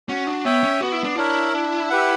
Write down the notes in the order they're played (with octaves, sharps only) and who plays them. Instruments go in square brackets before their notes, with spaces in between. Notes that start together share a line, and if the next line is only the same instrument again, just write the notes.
[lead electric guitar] C#4 [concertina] F#4
[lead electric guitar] D4
[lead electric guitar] B3 [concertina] C#5 E5 G5
[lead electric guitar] C#4
[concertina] B3 [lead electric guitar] F#4
[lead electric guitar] E4
D4
[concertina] D4 A#4 C#5 [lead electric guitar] E4
[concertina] D4
G4 B4 F#5